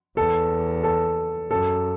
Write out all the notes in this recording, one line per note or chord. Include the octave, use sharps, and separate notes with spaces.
E2 A4
A4
F#2 A4